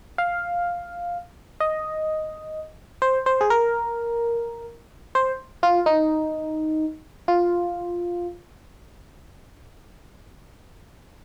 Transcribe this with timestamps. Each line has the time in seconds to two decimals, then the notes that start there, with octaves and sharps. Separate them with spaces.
0.18 F5
1.60 D#5
3.02 C5
3.26 C5
3.41 G#4
3.50 A#4
5.15 C5
5.63 F4
5.86 D#4
7.28 F4